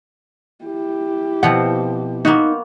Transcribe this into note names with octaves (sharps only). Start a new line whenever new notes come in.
E4 G4
B2 F3 C4 F#5
A#3 B3 D#4 F#4